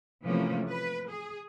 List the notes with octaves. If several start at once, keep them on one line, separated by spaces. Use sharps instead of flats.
C3 E3 F3 A3 A#3 C#4
B4
G#4